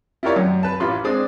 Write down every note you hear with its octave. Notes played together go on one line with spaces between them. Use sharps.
E4 F4 G4 A#4 C#5 D5
F#2
B4 A5
A1 F4 B5 C6
G#3 C4 D4 D5 D#6